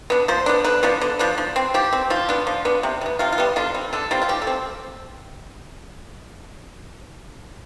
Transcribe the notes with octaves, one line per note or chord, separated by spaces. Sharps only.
B3 D4
F3 C5
B3 D4
D3 B4
F3 B3 D4
D3
F3 B3 D4
F3
C4
F3 G4
C4
F3 F4
B3 D4
F3
B3 D4
C3
G3
B3
C3 F4
F4
G3 B3
D3 F4
G3 C4
D3 A4
G3 C4 F4
F4
F3 G4
A4
C4